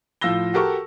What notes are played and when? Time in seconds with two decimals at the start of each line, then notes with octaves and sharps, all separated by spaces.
0.21 A2 F3 F4 E6 A#6 G7
0.54 F#4 G4 A4 A#4 A5 C#6